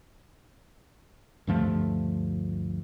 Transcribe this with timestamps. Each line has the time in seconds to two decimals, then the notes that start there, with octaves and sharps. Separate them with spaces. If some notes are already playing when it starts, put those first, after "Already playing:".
1.47 D2 G2 F3 A3